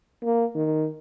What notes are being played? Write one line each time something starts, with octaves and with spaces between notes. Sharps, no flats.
A#3
D#3